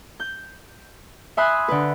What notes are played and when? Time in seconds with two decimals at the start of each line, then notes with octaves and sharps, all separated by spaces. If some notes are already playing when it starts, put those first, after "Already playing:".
0.20 G6
1.37 E5 G#5 B5 C6 D#6 F#6
1.68 D3 B4